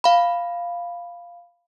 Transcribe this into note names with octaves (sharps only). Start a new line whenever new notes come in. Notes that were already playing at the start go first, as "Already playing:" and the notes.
F5 B5